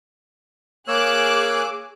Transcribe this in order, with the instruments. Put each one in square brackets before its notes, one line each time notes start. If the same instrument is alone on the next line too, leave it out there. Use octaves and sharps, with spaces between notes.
[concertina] A#3 C#5 E6 [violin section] G#4 D6 F#6